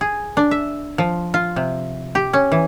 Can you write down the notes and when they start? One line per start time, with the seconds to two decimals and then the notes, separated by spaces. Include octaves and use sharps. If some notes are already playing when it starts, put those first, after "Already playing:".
0.01 G#4
0.37 D4
0.51 E5
0.98 F3
1.34 F4
1.56 C3
2.15 G4
2.33 C#4
2.52 E3